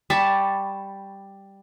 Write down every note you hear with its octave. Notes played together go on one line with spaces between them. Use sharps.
G3 A5 B5 C#6